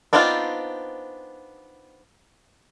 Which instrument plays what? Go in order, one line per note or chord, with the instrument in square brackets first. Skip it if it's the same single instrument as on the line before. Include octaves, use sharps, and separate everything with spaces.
[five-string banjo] B3 C4 D4 D#4 F4